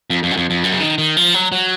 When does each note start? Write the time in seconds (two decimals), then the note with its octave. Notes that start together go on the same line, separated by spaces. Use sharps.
0.10 F2
0.23 F2
0.31 F#2
0.37 F2
0.50 F2
0.64 F#2
0.72 C#3
0.80 D#3
0.98 D#3
1.17 F3
1.34 F#3
1.52 F#3